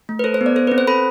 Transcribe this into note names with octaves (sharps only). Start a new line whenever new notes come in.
A3
B4
A4 C5
C5
B3
D5
A4 C5
B4
C4
C5
A4 B5